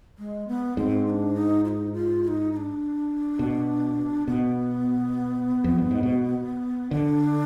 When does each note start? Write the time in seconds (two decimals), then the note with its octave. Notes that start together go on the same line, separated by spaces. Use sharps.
0.18 G#3
0.48 B3
0.77 G#2 C4
1.06 D#4
1.10 D4
1.35 D#4
1.65 F4
1.68 D#4
1.93 F4
2.23 F4
2.28 D#4
2.52 D#4
2.57 D4
3.39 B2
4.27 B2 B3
5.64 F2
5.78 G2
5.91 G#2
6.03 B2
6.91 D3 D4